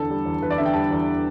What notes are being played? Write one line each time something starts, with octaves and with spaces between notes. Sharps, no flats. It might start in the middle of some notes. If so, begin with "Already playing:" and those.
Already playing: E2 D3 A4
G3
E2
E2 B4
D5
D3 E5
G5
G3 A5
E2